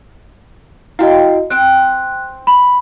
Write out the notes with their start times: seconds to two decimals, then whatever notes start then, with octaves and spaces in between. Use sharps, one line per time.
0.99 E4 F#4 D#5 F5 G5
1.50 C4 G5 F#6
2.47 B5